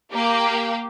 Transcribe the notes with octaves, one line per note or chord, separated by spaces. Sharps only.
A#3 G4